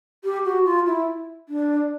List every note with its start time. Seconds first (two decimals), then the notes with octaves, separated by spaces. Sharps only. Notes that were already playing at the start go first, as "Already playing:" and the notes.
0.24 G4
0.45 F#4
0.65 F4
0.87 E4
1.49 D4